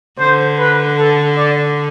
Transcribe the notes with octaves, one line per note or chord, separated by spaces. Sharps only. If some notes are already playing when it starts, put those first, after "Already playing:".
D3 C5
B4
A4
D5